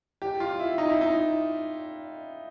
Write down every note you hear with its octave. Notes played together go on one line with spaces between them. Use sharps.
G4
F4
E4
D#4
E4
D#4